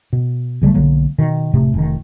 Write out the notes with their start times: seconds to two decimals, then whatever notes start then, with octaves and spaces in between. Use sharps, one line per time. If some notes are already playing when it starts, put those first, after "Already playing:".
0.13 B2
0.61 A#1 C#3 G3 A3
0.74 B1 D3 F#3 A#3
1.18 B2 D#3
1.53 F1 A2 C3 A3
1.74 F1 D#3